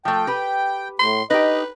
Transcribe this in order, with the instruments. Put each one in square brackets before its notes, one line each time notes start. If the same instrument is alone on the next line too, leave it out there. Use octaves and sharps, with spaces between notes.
[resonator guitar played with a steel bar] F3 A3 [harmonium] G5
[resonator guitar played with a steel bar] G4 B4
[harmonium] A2 [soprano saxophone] C6
[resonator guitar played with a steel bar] D#4 G4 [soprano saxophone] B4 [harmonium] D#5